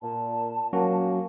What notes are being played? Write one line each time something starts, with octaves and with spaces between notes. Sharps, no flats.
A#2 A5
F#3 A#3 C#4 F#4